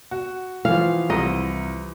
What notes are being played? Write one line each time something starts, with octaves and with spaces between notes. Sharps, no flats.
F#4
E3 F3 F5
C2 E4 D#5 A#5